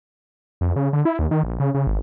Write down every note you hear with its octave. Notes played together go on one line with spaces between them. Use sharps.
F2
C#3
D3
E4
D#2
D#3
A#1
C#3
C#3
G#1